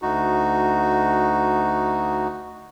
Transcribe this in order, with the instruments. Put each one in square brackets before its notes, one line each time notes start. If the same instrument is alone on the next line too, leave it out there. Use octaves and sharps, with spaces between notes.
[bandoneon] D2 D#4 F#4